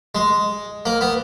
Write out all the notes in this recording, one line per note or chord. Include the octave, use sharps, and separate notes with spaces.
G#3
A#3
B3